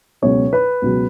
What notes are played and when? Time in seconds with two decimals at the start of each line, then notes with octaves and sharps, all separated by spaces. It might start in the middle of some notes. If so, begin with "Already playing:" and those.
0.22 C#2 B2 F#3 C#5
0.53 B4
0.82 C#2 B2 F#3